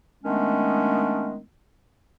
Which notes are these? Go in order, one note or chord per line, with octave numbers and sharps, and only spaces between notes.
D#3 G#3 A3 B3 C#4 D4